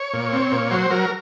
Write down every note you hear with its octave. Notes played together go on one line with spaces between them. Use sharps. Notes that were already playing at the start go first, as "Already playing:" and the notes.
Already playing: C#5
A#2
C4
A#2
F#3 C5
F#3 A#4